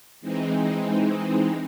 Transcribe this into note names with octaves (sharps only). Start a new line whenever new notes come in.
E3 G#3 C4 D#4